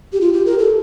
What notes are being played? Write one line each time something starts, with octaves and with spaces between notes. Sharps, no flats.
G4
F4
G4
A#4
A4